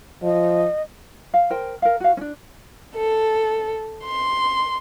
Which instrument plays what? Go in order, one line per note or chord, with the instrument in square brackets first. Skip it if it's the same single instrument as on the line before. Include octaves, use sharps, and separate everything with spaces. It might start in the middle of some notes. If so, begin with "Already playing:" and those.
[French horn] F3 [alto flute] D#5
[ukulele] F5
A#4 C5 G5
A#4 F5
F#4 F5
C#4 D4
[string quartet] A4
C6